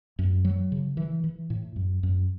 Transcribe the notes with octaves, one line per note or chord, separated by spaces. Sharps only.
F#2
F#3
C#3
E3
E3
A2
F#2
F#2